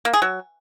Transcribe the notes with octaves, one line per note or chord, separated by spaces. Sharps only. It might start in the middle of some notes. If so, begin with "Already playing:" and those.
A#3
G#4
F#3